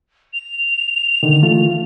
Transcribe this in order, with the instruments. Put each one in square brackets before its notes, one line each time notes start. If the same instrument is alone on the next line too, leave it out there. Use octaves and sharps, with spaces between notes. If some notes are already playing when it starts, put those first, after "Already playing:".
[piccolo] F7
[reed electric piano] D3 D#3
E3 A3 F4